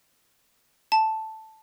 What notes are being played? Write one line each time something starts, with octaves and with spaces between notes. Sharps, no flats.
A5